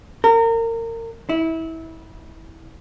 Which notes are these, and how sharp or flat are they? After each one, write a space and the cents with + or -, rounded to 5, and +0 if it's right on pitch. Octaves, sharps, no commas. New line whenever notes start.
A#4 -30
E4 -25